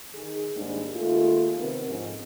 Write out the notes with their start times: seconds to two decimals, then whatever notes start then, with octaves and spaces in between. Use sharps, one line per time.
0.15 D#3 G#4
0.56 D#2 G#2 G3 G#3 D4
0.95 D#2 G#3 A3 F4
1.58 C3 D#3 B3 A#4
1.88 F2 G#2 C#4